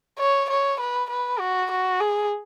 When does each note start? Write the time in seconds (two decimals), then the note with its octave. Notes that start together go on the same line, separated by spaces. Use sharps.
0.18 C#5
0.49 C#5
0.80 B4
1.09 B4
1.39 F#4
1.71 F#4
2.00 G#4